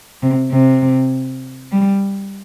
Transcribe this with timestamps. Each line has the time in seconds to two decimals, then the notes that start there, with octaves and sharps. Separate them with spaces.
0.23 C3
0.52 C3
1.72 G3